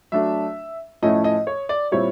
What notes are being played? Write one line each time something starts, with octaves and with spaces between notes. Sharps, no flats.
F#3 A3 D4 E5
A2 F3 A3 C#4 E4 D#5
D#5
C#5
D5
A#2 G3 C4 E4 C#5